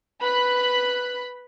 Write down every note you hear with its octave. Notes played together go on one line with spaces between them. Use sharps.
B4 B5 F#6